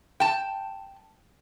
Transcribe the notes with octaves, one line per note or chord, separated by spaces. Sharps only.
G5 A5